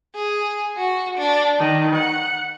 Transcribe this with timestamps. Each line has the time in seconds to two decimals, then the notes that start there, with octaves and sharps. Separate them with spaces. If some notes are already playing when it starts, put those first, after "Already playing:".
0.14 G#4
0.78 F#4
1.17 D4
1.59 D#3
1.95 F#5